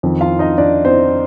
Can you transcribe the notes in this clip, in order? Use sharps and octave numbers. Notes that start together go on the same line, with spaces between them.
F2 D#3
F4 F5
D#4 D#5
D4 D5
C4 C5